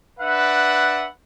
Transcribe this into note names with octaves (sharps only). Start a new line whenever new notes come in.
D4 B4 E5 F#5